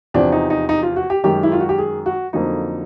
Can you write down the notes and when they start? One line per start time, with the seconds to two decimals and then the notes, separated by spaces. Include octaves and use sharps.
0.14 E2 C3 F3 D4
0.32 D#4
0.50 D#4
0.69 D#4
0.83 F4
0.96 F#4
1.10 G4
1.24 F#2 D#3 G#3 G4
1.43 E4
1.52 F4
1.61 F#4
1.69 G4
1.78 G#4
2.06 F#4
2.33 F2 D3 F#3 A#3 D#4